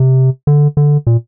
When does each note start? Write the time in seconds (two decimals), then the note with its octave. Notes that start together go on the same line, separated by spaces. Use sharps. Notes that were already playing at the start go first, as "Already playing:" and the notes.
Already playing: C3
0.47 D3
0.77 D3
1.07 A#2